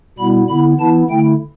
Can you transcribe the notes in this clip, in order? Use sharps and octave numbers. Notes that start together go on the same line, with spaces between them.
B2 G3 B3 E4 B5
D3 B3 E4 B5
E3 B3 E4 A5
D3 A3 E4 G5